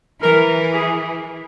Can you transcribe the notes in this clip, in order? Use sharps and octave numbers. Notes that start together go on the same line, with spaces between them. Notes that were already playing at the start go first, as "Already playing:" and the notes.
E3 A#4
G#4